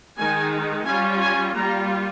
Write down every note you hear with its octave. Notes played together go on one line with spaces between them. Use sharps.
D#3 G#3 D#4 G#5
G3 C#4 F4 G#5
G#5
G3 A#3 F4 A#5